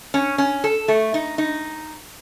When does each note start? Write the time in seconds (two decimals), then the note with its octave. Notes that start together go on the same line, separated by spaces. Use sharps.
0.14 C#4
0.38 C#4
0.64 A4
0.88 A3
1.14 D#4
1.38 D#4